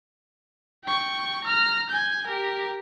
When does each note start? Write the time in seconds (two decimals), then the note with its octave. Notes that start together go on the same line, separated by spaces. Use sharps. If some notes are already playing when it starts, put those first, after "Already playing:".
0.84 G5 C#6
1.44 A#5 F6
1.89 G#5 G6
2.27 G4 A#4